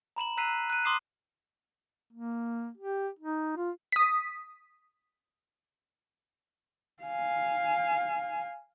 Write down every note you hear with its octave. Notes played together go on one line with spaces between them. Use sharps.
A#5 B5 E7 F#7
A#5 E6 F#6 B6 C7 D#7
F#6 D#7
C6 D6 D#6 C7 E7
A#3
G4
D#4
F4
D#6 B6
F5 G#5